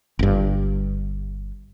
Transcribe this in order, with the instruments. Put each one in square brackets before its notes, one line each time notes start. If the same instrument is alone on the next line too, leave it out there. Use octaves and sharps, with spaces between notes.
[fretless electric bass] G1 G2